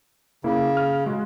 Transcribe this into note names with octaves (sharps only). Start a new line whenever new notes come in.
C#3 A#3 E4
F6
G#3 F#4